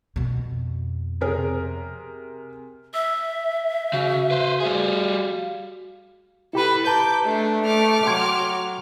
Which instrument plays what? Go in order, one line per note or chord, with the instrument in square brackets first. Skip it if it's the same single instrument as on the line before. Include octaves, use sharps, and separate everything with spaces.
[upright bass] F2 B2
[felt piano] C3 G#4 A#4
[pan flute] E5 [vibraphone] E6
[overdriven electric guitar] C#3 [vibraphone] F#4 F5
[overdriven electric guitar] B4 C5
G3 G#4
[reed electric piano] E4 G4 B5 [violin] A4 B4
[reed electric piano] B4 A5 A#5 [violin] D6 G6
[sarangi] A3 [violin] D4
[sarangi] A3 [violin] D6 F6
[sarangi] F#3 [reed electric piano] G5 C6 G#6